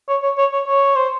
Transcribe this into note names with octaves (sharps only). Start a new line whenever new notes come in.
C#5
C#5
C#5
C#5
C#5
C5